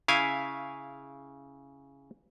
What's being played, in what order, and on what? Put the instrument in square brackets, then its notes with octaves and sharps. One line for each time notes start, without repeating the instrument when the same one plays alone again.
[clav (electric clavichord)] C#3 E4 F5 G#5